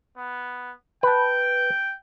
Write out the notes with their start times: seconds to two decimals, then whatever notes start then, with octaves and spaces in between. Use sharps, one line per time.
0.17 B3
1.03 B4 G5 A5